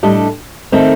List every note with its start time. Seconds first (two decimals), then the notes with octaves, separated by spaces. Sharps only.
0.03 A2 G3 D4 A4 D#5
0.72 D#3 A3 C4 D#4